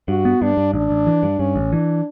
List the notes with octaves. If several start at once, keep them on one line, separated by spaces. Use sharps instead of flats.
G2 F#4
B3
G2 D4
G2
A1 D4
A1
E3
G2
G2 C#4
A1
E3 D4